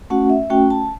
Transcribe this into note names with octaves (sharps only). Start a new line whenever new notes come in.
A3 C#4 F#4 F#5
E5
A3 C#4 F#4 G5
A5